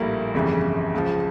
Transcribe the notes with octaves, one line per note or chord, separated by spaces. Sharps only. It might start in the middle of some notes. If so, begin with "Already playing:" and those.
Already playing: A#1 A2 G3 A#3 E4
G1 F2 C#3 E3 G3
C#2 C#3 F3